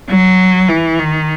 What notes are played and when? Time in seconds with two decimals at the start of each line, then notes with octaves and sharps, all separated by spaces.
0.10 F#3
0.69 E3
0.99 D#3